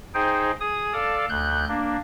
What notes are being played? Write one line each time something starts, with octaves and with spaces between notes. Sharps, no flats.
D#4 G#4 C5 G5
G#4 D#6
A4 D5 F5 A5
D2 F#6 G6
A#3 D4